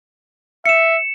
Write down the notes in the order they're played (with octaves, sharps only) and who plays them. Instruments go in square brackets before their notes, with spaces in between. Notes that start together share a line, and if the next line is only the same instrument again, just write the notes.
[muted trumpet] E5 [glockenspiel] C#7 E7